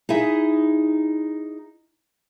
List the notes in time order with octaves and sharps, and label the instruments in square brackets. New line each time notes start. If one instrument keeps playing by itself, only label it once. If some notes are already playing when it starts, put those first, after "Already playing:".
[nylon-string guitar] D#4 E4 G#4 E5